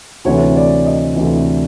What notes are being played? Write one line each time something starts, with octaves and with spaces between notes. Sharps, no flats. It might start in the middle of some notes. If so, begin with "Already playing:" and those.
D2 C3 E3 C#5
D5
D#5
D2 C3 E3